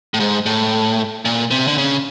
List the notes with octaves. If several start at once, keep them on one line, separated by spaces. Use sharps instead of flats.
A2
G#2
A2
A#2
C3
D3
C#3